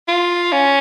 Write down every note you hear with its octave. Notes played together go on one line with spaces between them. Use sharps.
F4
C#4